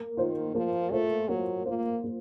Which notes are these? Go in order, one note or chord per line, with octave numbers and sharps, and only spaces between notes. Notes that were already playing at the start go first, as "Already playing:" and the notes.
Already playing: A#3
D#3 F4 C5
F3 A#3
A3 F4 C5
F#3 A#3
A#3 F4 C5
A#3